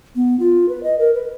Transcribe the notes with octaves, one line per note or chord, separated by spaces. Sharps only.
B3
F4
B4
D#5
A#4
B4